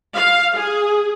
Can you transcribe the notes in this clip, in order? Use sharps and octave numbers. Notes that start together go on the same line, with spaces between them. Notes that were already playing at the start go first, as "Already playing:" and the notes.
F5
G#4